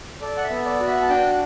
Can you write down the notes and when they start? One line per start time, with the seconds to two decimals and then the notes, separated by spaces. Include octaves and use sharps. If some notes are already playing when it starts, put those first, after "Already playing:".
0.21 A4 D5
0.37 F#5
0.44 E5
0.50 B3
0.66 D5
0.80 F#4
0.87 E5
1.02 A5
1.10 D4 G5